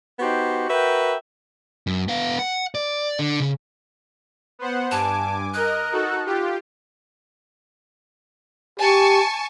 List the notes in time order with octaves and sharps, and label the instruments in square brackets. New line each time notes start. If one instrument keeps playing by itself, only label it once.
[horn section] B3 D#4 F#4 G4 C5 G5
F#4 A#4 B4 E5 G5
[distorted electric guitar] F#2
B3 F5
F#5
D5
D3
C#3
[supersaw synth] B3 C5 F#5
[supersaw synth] G2 G#5 D6 [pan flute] A5
[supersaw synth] A#4 D#5 [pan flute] F#6
[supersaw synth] D#4 F#4 A4
F4 G4
[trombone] G4 [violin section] G#5 A5 C#6